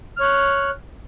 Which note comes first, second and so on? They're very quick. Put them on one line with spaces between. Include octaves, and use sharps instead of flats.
F6 C#5 F#6